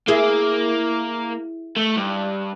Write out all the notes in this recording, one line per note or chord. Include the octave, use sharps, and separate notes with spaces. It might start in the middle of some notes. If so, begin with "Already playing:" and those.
A#3 E4 G#4
A3
G2